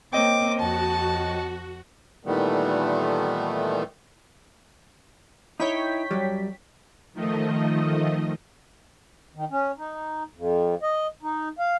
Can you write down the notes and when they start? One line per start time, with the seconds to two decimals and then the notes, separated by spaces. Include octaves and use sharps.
0.13 A#3 C4 C#5 D#5 G5 D6
0.60 F2 F#4 A5
2.26 A#2 D#3 E3 G3 A3 B3
5.60 D#4 E4 C#5 G5 B6
6.11 F#2 F#3 G3
7.13 D#3 F3 A3 D#5
9.35 D#3
9.51 C#4
9.78 D#4
10.36 F2
10.83 D#5
11.23 D#4
11.59 F5